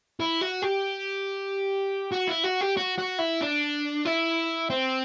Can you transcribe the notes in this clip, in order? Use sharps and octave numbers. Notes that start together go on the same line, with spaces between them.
E4
F#4
G4
F#4
E4
F#4
G4
F#4
F#4
E4
D4
E4
C4